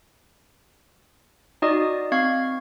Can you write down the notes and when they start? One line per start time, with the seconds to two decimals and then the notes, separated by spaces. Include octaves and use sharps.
1.62 D#4 F#4 D5 D#5 D#6
2.12 C4 F5 C#6 G#6 C7